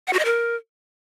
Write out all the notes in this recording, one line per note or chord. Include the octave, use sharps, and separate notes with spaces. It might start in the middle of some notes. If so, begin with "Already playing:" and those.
F#5
F#4
D#5
A#4